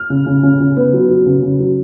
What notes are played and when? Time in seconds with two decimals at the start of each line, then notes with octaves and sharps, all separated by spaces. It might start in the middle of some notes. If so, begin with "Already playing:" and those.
Already playing: F6
0.10 C#3
0.26 C#3
0.43 C#3
0.60 C#3
0.77 B3
0.93 F#3
1.10 F#3
1.26 C#3
1.42 C#3
1.59 F#3